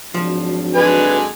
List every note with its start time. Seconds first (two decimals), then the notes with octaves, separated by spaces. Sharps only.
0.14 G#1 F3 F#3 D4
0.75 D3 G#3 B4 G#5